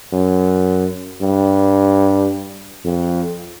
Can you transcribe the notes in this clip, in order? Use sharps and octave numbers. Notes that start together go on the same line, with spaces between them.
F#2
G2
F2